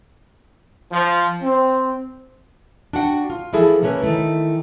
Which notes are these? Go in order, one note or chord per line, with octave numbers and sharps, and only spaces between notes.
F3
C4
D4 F#4 F#5 G5
F4
E3 F3 E4 G#4 A4
A3 A#3 C#4 B4
D#3 E3 A3 E4